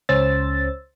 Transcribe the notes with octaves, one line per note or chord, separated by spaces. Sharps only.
C#2 C#4 C5 E6 A6